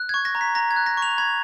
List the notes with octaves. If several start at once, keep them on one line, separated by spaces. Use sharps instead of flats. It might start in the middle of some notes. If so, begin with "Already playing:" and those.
Already playing: F#6
C#6 G#6
A#6
A#5
B6
A#5 A#6
G#6
F#6
A#6
C#6
F7
B5 G#6